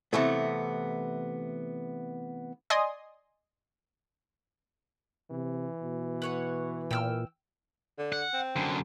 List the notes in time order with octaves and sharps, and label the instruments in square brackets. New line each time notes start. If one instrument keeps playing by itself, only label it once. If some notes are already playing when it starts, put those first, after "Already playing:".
[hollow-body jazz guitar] C3 E3 A3 B3
[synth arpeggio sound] D5 D#5 G#5 C6 D#6
[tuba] C3 [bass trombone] E3
[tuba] B2
[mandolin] B4 C#5 F#5
[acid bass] A#2 [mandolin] G5 E6 F6
[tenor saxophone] D3
[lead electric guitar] F#5
[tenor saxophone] C4
[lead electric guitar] F#2 D3